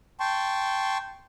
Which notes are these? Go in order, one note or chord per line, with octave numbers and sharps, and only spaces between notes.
G5 A5 C6 C#6